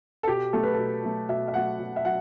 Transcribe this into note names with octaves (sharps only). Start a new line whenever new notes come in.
A4
B2 G4
F#3 A3 A4
B4
B2 A4
F#3 A3
B2 E5
E5
F#3 A3 F#5
B2
E5
F#3 F#5